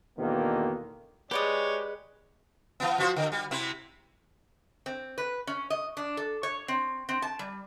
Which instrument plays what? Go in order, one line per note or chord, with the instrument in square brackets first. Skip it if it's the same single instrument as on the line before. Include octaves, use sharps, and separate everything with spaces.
[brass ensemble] E2 B2 D3 D#3 A#3
[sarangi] G#3 [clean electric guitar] G4 [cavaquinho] B4 D5 D#6 [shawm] C#5
[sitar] E3 B3
F3 F#4 C5
D3
G3
C3 C4 E4
[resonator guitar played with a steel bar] C4
B4
C#4
D#5
D4
A4
C#5
C4
C4
A5
G3